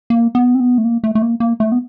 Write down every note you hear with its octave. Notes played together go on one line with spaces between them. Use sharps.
A#3
B3
C4
B3
A3
A#3
A3
A3
A#3
A#3
A3
B3